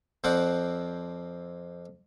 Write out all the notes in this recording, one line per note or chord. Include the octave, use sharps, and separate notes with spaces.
F2 F3 C4 D5 F#5